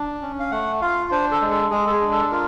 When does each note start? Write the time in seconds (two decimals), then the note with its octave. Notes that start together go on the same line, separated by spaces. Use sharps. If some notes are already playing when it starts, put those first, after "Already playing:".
Already playing: D4
0.21 C#4
0.40 F5
0.51 A3 F#5
0.81 F4 F5
1.11 D4 C5
1.31 A4
1.41 G#3
1.51 A4
1.71 G#3 G#4
1.87 A4
1.91 G#4
2.01 D4
2.11 A4
2.32 F4 A#4